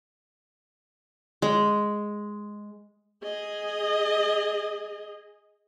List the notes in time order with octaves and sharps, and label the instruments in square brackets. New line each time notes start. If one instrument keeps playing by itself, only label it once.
[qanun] G#3
[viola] G#4 D#5